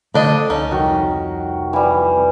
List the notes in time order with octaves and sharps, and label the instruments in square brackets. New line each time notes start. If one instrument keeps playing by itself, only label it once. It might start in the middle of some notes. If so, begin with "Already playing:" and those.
[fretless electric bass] D3 A3 [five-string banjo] F3 D4 D#5 [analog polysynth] A4
[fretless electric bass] C#2 [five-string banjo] C#4 D#4
[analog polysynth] C2 F2 [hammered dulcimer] D#3 F#4
[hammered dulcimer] E3 G3